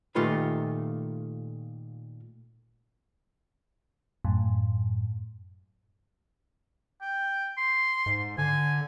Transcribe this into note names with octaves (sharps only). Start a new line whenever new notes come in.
A#2 D#3 A3 F4 G4 B4
F#2 A2
G5
C6
G#2
D3 G#5